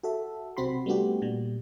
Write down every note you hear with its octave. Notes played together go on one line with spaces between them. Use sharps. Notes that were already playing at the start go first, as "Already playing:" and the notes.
F#4 A4 E5
B1 C3 C4 F#4 B5 C6
G3 A3 B3 D4 F#4 G4
A#2 G3